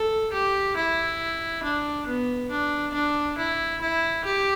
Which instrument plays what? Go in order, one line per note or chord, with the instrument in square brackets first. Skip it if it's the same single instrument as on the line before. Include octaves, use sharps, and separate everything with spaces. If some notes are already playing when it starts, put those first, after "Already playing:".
Already playing: [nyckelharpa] A4
G4
E4
D4
B3
D4
D4
E4
E4
G4